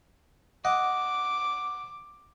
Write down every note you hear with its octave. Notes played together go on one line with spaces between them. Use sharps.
D#5 F#5 D6